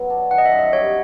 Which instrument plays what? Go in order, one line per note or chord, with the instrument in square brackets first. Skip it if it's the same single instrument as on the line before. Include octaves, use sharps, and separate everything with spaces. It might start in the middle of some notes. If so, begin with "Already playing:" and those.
Already playing: [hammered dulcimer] F#3 B3
D4
[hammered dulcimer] D#3 [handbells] F#5
[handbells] D#5
E5
[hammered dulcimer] F#2
[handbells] D#5
[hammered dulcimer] G3 [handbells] C#5